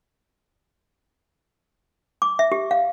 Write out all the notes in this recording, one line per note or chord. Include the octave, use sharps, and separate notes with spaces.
D6
E5
G4
F5